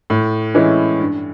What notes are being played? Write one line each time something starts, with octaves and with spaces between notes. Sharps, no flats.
A2
E3 G#3 C#4 E4
G2